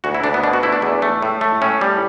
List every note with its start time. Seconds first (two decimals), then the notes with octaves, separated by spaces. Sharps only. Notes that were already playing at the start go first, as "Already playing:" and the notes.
0.04 D2 F#4
0.15 E4
0.24 D2 D4
0.34 B3
0.43 B2 D4
0.53 F#4
0.63 A3 E4
0.73 D4
0.82 E2
1.02 A3
1.23 A2
1.41 A3
1.62 A2 C#4
1.81 G3